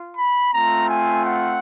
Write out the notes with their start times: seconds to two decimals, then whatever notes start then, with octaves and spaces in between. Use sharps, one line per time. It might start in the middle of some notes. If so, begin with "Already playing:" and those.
Already playing: F4
0.17 B5
0.53 A3 C4 F4 A#5
0.90 G#5
1.26 F#5